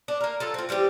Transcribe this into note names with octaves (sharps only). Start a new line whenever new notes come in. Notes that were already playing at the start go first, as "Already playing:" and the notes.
D4
A#3 A#4
F#3 F4 A4
C4 F4
E3 G3 C4 G4